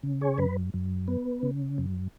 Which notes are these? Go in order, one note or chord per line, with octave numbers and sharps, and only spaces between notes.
C#3
G#4 C#5
F#2 B4
F#2
B3
C#3
F#2